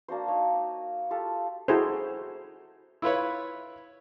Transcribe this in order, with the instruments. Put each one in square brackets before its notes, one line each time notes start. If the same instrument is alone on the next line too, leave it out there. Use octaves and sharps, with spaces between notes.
[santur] A#3 D4 F#4 C5
D#4 C#5
D#4
F4 G4 A4
[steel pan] E4 F#4 G#4 A4 C5
[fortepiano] E4 F4 B4 C#5